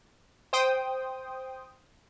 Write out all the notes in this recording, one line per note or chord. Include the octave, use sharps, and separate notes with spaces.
C5 G5 D#6